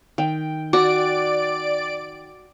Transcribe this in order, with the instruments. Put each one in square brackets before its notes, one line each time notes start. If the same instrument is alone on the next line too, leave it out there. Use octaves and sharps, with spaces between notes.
[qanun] D#3 [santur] G5
[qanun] F#4 [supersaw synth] D5 D7 [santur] D6